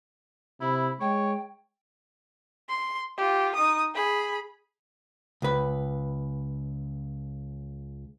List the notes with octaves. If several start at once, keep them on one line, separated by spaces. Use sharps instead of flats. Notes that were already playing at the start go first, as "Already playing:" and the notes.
C3 E4 B5
G#3 C#5 G5
C6
F4 G4
D#4 D#6
G#4 B5
C#2 B4